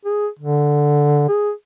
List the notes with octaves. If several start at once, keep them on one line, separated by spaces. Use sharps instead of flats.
G#4
D3
G#4